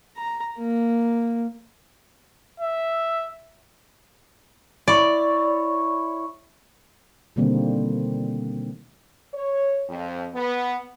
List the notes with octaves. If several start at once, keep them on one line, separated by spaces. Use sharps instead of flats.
A#5
A#3
E5
E4 C#5 D5
B2 D3 D#3 G3 A#3 C4
C#5
F2
B3